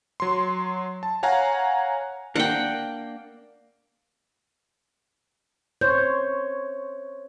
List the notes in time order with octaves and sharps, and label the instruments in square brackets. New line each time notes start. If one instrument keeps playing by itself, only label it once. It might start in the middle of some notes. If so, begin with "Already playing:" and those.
[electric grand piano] F#3 C6
A5
C#5 F5 F#5 G#5 A#5
[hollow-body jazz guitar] A#3 D4 [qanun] F#5 G5
[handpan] C5 C#5 [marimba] G6